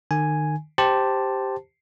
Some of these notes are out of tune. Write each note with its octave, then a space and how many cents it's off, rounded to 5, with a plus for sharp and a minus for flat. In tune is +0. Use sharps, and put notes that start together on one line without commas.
D#3 -35 G#5 +0
G4 +0 C5 +0 A5 +5